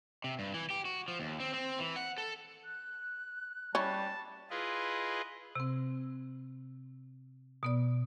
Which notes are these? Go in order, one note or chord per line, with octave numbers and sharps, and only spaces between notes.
C3
G2
E3
G4
F#4
F3
D#2
C4
C4
E3
F#5
A4
F#6
G3 C#4 E4 A5
E4 F4 G#4 B4 D#5
C3 C4
B2 B3 D5